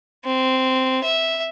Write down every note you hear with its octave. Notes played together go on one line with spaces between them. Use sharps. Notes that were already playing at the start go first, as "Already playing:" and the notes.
C4
E5